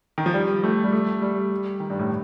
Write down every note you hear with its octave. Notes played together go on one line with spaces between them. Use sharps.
D#3
F3
G3
A3
G3
A3
G3
D#3
G2
A2